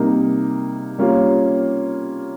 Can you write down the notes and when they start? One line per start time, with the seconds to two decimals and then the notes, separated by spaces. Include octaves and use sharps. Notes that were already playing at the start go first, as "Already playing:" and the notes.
Already playing: C3 G3 A#3 D#4
0.99 G3 A#3 C#4 F4